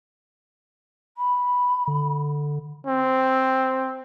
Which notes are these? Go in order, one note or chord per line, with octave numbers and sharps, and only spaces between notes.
B5
D3
C4